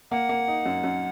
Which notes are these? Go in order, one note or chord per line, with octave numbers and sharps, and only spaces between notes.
A#3 F#5
A#3
D#4
F#2
F#2